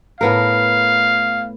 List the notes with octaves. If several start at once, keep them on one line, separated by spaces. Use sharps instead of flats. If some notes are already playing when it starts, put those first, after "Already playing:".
A2 B3 A#4 F5